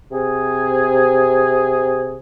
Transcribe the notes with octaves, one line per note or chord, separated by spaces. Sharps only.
C3 G#4